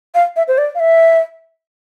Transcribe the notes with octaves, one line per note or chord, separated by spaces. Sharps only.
F5
E5
C5
D5
F5
E5